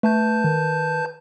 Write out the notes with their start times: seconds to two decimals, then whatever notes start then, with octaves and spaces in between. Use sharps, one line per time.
0.03 A3 B4 A5 G6
0.44 D#3